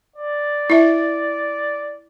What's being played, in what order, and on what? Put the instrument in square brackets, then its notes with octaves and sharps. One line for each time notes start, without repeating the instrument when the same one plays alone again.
[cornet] D5
[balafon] E4 E5